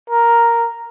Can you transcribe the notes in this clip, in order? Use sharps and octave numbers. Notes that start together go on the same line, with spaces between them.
A#4